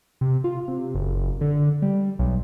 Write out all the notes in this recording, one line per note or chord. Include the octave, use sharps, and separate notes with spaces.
C3
F4
C3
F#1
D3
G3
B1